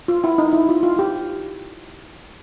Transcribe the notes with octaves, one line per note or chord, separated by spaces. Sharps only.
F4
E4
D#4
E4
F4
F4
G4